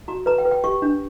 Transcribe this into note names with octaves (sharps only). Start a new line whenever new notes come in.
F#4 A#5
B4 A#5
G5
B4
G5
G4 C#6
D4